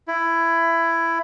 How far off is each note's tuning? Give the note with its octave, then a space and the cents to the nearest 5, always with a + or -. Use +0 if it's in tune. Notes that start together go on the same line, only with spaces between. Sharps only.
E4 +15